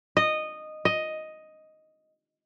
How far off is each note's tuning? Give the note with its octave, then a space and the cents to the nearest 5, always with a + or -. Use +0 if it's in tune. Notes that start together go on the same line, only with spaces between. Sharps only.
D#5 -10
D#5 +5